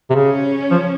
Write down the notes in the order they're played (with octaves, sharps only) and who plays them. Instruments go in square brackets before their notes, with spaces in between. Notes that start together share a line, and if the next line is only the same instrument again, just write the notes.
[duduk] C3
[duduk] C#3 [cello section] C#4
[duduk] F3